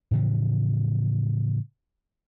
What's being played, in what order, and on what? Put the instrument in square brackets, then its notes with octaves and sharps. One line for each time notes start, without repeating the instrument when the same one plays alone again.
[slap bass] A2 C#3 E3 F3